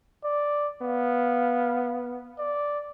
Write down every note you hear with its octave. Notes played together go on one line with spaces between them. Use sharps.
D5
B3 F5
D5